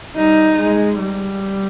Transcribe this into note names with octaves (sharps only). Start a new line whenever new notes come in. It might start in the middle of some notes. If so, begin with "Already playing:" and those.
G3 D#4
G#3
G3